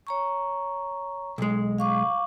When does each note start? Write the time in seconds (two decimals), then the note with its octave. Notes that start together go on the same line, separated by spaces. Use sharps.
0.07 C#5 A#5 C#6
1.38 B1 G#3
1.78 F5 C#6 D6